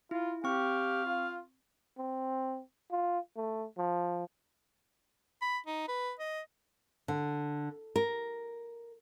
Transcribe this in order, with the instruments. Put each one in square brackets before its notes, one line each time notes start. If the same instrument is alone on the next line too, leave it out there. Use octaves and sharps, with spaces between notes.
[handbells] E4 [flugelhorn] F4
[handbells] C4 C#6 [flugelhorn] G4 [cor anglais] F5
[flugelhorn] F4
[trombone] C4
F4
A3
F3
[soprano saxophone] B5
D#4
B4
D#5
[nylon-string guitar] D3
A#4